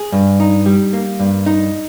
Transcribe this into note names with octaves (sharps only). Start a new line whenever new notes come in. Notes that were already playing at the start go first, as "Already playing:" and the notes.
Already playing: G#4
G2
D#4
G3
A#3
G2
D#4